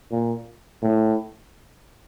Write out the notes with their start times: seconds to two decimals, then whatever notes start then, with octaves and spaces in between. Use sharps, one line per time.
0.11 A#2
0.82 A2